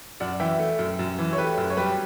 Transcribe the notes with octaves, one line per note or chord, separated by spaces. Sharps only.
F#2 D5 F#5
E3 E5 G5
A3
F#2
F#2
E3
C#5
A3 G4 B4
F#2
C#5
G3 G4 B4